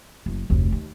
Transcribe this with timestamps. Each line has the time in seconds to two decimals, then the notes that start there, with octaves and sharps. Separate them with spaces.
0.26 F#1
0.50 F1 D2
0.72 D#2